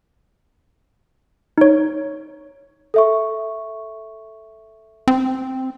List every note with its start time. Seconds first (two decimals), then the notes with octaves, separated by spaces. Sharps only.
1.58 D#4 C#5
2.94 A4 E5 C#6
5.08 C4